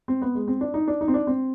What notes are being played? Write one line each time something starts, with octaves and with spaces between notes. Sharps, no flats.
C4
B3
G#3
C4
D4
D#4
D4
D#4
C4
D4
C4